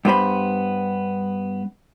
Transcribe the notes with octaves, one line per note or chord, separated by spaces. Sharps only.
G2 B3 C5 B5